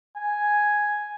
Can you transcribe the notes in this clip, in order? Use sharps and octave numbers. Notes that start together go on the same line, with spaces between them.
G#5